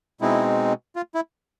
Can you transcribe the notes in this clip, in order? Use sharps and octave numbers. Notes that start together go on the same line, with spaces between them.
B2 G#3 C4 D#4 E4
F4
E4